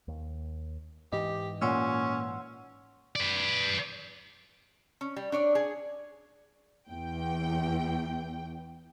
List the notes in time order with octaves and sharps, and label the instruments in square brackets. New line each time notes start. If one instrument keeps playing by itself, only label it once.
[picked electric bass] D#2
[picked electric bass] G#2 E3 [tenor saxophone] G4 [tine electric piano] D#5
[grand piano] A#2 [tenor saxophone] C#4 [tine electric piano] F#5 C6 E6
[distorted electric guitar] B4 D5
[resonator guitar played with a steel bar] C#4
G3
D4 C#5 D5
G#4
[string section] E2 G5